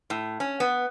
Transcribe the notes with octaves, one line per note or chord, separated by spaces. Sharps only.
A2
C#4
B3